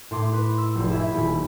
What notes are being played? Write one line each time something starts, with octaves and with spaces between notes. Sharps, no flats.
A2 C6 D6
B4
E6
F1
E4 G#4 E5
D#1 B5